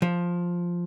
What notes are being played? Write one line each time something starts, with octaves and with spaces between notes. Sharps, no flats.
F3